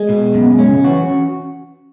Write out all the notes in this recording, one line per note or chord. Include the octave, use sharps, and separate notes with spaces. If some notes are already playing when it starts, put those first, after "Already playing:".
Already playing: G#3
B2
F#2 B3
G#3
C#4
C#3
E3 F#4
C#4